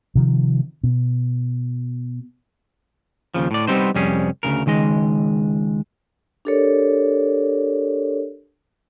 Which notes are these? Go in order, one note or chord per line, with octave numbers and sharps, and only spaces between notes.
C3 D#3 F3
B2
D#2 C#3 F3
A2 D5
G3 B3 C4 D#4 C5
C2 F2 G3 C#4 G#4
D2 G2 C#3 A#4
C#2 D#3 G#3 D#5
D4 G4 A4 A#4 C#5 D5